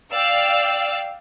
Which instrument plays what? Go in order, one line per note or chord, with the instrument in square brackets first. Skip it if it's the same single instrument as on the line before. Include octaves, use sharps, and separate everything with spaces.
[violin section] D5 F5 G5 E6